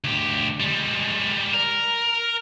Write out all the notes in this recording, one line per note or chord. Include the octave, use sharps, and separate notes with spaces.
D2 G4
G3 G#3
A#4